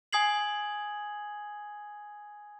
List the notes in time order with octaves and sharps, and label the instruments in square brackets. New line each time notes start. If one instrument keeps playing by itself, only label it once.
[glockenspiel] G#5 D#6 G#6 C7 F#7